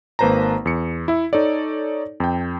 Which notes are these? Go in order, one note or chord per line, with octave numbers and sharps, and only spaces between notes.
G#1 A#3 B4 C5 A5 A#5
E2 C#7
E4 E5
D#4 A4 C#5 D5
F2 G5